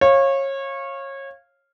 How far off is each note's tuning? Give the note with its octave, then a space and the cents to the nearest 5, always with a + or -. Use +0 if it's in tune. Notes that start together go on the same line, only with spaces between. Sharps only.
C#5 -25 F5 -5